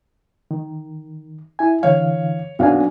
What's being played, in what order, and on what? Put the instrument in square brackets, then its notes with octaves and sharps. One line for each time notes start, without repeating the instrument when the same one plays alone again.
[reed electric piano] D#3
E4 G#5
[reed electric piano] D3 E3 F5 [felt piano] C#5
[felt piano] B1 F#4 F5 [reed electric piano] C4 D4 G#5